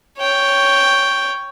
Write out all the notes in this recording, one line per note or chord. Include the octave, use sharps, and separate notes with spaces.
C#5 G5